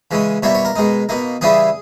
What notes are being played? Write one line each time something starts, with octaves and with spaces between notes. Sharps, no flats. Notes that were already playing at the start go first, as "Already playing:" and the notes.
C#3 E3 G#3 C#4
B2 G3 A#3 E4 C#5
C#5
A#4
B2 G#3 D#4
B2 A#3 D#4
C#3 E3 G3 C#4 E4 G#4